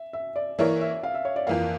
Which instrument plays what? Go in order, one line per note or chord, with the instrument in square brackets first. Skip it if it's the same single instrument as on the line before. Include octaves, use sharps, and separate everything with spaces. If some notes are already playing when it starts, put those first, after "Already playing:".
Already playing: [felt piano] E5
E5
D5
[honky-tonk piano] E3 A#3 E4 A#4 C#5 [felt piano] D5
[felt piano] E5
F5
E5
C#5
D5
[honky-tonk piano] F2 E3 A#3 [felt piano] F5